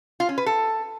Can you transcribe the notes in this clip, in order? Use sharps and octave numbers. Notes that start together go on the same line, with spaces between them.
F4
C#4
B4
A4